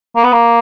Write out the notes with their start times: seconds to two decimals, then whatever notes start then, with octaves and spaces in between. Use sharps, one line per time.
0.16 A#3
0.24 B3
0.32 A#3